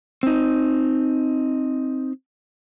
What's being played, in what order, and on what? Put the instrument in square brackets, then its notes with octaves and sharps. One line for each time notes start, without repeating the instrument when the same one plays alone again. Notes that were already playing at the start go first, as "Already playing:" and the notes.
[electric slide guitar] C4 D#4